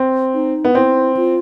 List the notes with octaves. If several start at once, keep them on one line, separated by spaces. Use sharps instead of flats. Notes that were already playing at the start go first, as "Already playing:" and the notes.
Already playing: C4
D#4
B3
C4 E4
F4